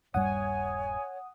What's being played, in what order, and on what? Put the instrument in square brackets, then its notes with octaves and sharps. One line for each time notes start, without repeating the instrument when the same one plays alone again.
[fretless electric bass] D#1 G2 G3 [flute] C#5 [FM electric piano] F#5 D#6 [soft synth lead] G#5